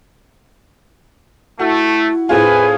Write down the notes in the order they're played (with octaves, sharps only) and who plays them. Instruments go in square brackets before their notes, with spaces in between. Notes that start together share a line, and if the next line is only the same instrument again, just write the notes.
[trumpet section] A3 [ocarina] E4 [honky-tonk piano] F#4
[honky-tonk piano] A2 C4 F4 [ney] G#4 [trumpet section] B4 G#5